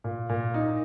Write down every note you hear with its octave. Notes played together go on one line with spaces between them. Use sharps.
A#2
A#2
D#4